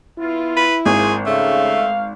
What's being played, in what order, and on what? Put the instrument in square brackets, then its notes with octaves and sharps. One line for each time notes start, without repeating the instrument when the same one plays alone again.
[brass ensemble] B3 F4 [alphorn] E4
[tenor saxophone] B4
[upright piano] G#1 [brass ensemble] G#3 A#3 C5 [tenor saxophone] G#4
[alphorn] C#3 [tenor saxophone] A3 [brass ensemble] F5